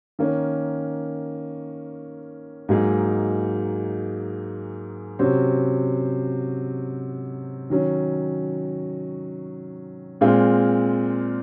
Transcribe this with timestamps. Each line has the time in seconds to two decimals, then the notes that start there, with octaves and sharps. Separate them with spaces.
0.19 D#3 A#3 C#4
2.69 G#2 F#3 A#3 D#4 G#4
5.19 C3 F#3 C#4 F#4 C5
7.70 D#3 F#3 C#4
10.21 A#2 G#3 C4 F4 G#4